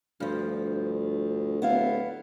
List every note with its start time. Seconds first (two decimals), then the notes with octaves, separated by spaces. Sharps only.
0.20 D2 G2 F3
1.62 D1 B3 E4 F5